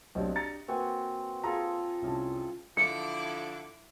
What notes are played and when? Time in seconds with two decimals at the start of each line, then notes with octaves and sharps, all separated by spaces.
0.15 B1 C4 D4 G4 D#5
0.36 A#5 A6 C#7
0.68 A#3 C4 F#4 B4 G#5
1.44 F4 G#4 A4 A#5
2.02 C2 C#4 A5
2.77 D3 F3 E4 D6 C#7